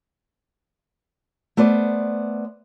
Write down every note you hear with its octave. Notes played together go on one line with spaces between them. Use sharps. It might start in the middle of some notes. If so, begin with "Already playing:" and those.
A3 B3 C5 D5